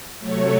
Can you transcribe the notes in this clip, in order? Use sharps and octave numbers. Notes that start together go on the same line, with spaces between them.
C3 F#3 A3 C#5